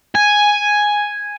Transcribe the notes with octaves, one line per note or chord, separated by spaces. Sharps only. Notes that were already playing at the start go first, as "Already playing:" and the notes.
G#5